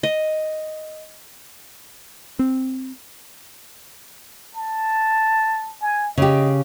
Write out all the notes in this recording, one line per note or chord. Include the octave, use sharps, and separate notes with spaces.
D#5
C4
A5
G#5
C#3 G4 D#5